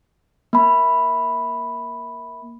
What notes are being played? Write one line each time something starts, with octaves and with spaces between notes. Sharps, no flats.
A#3 B5